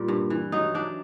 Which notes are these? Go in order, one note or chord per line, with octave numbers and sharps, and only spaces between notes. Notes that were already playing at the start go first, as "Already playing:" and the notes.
Already playing: A#2 G3
G2
E3
F#3 D#4
F#3 D4